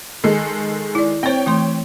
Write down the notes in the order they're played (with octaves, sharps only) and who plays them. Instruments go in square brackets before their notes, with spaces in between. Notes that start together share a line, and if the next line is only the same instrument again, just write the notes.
[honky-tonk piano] D#3 G#3 A4
[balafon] E4 D5
[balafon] C4 C5 [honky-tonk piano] C#5 G5
[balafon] E3 A3 C6